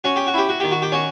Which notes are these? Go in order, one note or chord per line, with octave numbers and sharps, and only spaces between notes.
C#4 F#4
G4
F#4
E4 G4
F#4
D#3 G4
F#4
G4
C#4 F#4